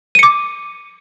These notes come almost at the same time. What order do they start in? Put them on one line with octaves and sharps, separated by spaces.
D#7 C#7 D6